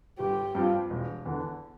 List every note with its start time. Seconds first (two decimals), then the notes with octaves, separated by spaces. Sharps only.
0.19 G1 G4
0.55 G2 F3 C4 F4
0.90 E1
1.26 E2 D3